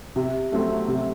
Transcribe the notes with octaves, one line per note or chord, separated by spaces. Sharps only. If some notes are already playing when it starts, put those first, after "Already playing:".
C3
F#3 A3 C4 F#4
C3